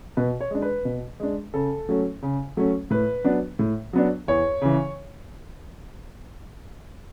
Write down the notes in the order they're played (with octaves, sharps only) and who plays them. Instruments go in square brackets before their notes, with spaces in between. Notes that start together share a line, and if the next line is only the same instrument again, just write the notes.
[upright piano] B2 B4
C#5
G#3 D4
B4
B2
G#3 D4
C#3 A4
F#3 A3 C#4
C#3
F#3 A3 C#4
A2 B4
F#3 B3 D4
A2
F#3 B3 D4
E2 C#5
C#3 E3